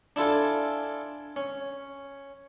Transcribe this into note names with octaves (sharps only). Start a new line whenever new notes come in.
D4 E4 F4 A4 G#5
C#4